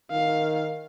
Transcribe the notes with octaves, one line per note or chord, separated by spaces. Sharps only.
D#3 F5